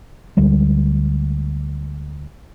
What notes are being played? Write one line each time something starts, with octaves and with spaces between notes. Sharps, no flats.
D2 G3 G#3